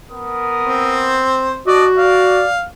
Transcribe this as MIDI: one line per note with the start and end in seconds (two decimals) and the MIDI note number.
0.11 1.24 59
0.11 1.24 70
0.11 1.24 87
0.63 1.61 60
0.63 1.61 72
1.67 1.86 62
1.67 2.43 66
1.67 1.87 74
1.67 1.86 75
1.97 2.53 74
1.97 2.64 77